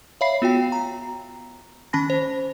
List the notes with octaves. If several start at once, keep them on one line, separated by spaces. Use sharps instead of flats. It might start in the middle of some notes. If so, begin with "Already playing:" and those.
C#5 E5 F5 B5 C7
B3 F4 F#4 G5
A#5
D#3 C#4 A5 B5 A#6
C5